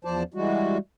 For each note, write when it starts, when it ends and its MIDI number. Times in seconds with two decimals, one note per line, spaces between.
0.05 0.23 40
0.05 0.23 53
0.05 0.23 72
0.05 0.23 74
0.05 0.23 81
0.34 0.78 52
0.34 0.78 55
0.34 0.78 56
0.34 0.78 66